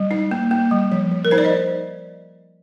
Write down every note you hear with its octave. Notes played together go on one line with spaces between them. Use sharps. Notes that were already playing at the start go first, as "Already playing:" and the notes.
Already playing: G3
D#4
A#3
A#3
G3
F3
F3
A#4
D#4 C5
D5
D#5